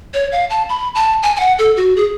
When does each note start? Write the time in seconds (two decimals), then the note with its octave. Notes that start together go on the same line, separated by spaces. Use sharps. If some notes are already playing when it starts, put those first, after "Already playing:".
0.14 C#5
0.32 F5
0.50 A5
0.69 B5
0.95 A5
1.23 G#5
1.36 G#5
1.40 F#5
1.59 A4
1.77 F#4
1.96 G#4